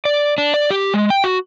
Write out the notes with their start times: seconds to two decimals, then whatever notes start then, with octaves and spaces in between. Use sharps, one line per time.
0.05 D5
0.38 D4
0.54 D5
0.71 G4
0.94 G#3
1.10 G5
1.24 F#4